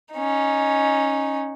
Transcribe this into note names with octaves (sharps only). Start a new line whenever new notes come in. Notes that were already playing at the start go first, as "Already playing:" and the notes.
C#4 D#4